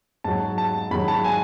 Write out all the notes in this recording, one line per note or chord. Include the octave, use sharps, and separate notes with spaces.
G#2 F#3 A5
A5
G#2 D#3 F#3 B5
A5
G#5